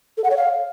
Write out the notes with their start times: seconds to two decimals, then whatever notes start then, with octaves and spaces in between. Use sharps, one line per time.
0.17 A4
0.24 F#5
0.30 C#5
0.37 F5